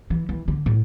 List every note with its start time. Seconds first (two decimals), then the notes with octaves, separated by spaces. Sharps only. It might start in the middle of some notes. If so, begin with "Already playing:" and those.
0.10 E3
0.29 E3
0.48 D3
0.66 A2